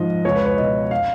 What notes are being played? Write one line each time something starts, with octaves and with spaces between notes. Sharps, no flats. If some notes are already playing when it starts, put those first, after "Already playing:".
Already playing: G#2 F3 D#5
C#2 C#5
B4
C#5
B2 D#5
F5